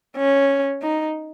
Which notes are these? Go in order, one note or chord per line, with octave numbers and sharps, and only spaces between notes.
C#4
D#4